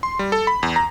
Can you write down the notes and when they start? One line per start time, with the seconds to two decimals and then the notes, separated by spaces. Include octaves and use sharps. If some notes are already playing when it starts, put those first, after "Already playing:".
0.03 C6
0.19 G3
0.32 A4
0.47 B5
0.63 E2
0.76 A#5